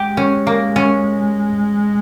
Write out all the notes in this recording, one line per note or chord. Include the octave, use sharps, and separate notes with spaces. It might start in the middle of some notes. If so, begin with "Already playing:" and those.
Already playing: G#3 G4
C#4
A#3
C#4